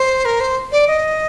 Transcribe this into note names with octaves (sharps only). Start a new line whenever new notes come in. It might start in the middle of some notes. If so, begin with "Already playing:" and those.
Already playing: C5
A#4
C5
D5
D#5